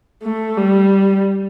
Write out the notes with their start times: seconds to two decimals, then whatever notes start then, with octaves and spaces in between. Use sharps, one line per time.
0.23 A3
0.58 G3